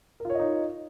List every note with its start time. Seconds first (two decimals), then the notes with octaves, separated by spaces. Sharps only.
0.20 A#4
0.25 F4
0.30 C#5
0.35 D#5
0.39 D#4